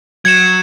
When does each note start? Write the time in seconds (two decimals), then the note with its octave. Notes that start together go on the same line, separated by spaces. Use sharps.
0.25 F#3 G#6 C#7 E7